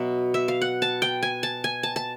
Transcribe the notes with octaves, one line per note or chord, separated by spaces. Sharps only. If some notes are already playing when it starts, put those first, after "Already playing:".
Already playing: B2 F#3 B3 E5
E5
F5
F#5
A5
G5
G#5
A5
G#5
A5
A5